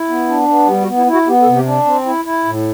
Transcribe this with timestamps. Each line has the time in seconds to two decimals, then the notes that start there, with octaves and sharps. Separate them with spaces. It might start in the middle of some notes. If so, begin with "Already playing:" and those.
Already playing: E4
0.09 B3
0.29 D4
0.48 B3
0.68 G3 G4
0.82 F#4
0.87 B3
0.97 E4
1.08 E4
1.13 F#4
1.27 B3 G4
1.42 A4
1.47 C3
1.56 G4
1.66 D4
1.85 C4
2.06 E4
2.25 E4
2.45 A2